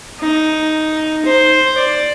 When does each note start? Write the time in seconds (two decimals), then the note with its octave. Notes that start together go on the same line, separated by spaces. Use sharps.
0.20 D#4
1.25 C5
1.78 D5